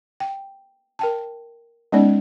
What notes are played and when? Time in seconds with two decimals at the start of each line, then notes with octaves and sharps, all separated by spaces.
0.20 G5
0.99 A#4 G5 A5
1.92 G#3 B3 C#4 D#4 D5